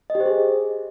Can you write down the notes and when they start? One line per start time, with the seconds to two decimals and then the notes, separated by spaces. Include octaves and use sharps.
0.10 D#5
0.15 G4
0.20 C5
0.26 G#4